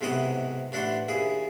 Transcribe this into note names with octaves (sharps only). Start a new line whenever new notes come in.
B1 G#2 C3 E4 F#4 D#5
A1 D4 E4 F#4 C5
A#1 D#2 E4 G#4